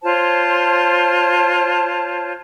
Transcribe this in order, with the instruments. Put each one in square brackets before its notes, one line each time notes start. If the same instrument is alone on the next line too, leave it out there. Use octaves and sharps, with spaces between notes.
[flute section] F4 C5 C#5 A5